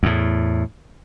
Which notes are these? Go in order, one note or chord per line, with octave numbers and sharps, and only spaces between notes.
E2 A2